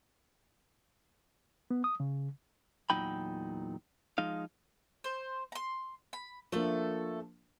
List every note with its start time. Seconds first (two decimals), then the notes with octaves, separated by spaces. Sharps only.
1.71 B3
1.84 D#6
2.00 C#3
2.90 E2 A#2 F#3 D#4 G5 B5
4.18 F3 G#3 D#4 F5
5.04 C5
5.52 A#5 C6
6.13 B5
6.52 F3 A3 A#3 D4 A4